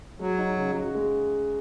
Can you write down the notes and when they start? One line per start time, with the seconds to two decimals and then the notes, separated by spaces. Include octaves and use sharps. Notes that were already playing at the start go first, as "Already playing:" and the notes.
0.19 F#3 G#3
0.38 D#4
0.57 C#3
0.76 F#4
0.95 G#3